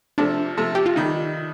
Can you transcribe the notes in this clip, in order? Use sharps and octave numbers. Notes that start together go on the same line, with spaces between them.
C3 F3 A3 D4
C3 F3 A3
G4
F4
D#3 G3 D#4